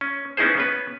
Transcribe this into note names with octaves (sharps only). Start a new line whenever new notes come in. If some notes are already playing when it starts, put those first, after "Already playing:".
C#4
B3 C#4 D#4 E4 G#4 C5
B3 C#4 B4